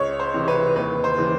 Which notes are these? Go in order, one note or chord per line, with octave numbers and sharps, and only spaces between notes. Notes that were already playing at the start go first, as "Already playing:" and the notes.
Already playing: C#2 C#5
C5
C3 E3
B4
D#2 B4
C5
C#3 E3